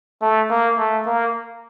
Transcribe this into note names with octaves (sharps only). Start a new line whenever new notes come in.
A3
A#3
A3
A#3